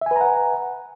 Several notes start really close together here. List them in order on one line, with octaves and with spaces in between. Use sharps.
E5 G#5 B4 A#5 F#5